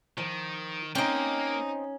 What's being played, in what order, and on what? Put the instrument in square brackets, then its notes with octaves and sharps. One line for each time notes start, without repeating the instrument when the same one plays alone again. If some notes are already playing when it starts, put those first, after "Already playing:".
[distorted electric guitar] D#3 [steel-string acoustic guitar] F3
[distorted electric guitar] A#3 [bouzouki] C4 D#5 [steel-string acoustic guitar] C#4 [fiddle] D#4